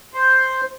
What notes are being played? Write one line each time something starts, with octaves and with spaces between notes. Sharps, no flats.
C5